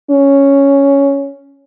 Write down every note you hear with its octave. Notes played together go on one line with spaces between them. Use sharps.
C#4